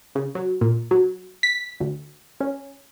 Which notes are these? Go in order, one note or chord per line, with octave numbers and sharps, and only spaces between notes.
C#3
F#3
A#2
F#3
B6
D2
C#4